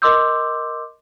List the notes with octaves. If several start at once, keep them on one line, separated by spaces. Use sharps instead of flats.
A#4 D#5 C6 D6 E6 G6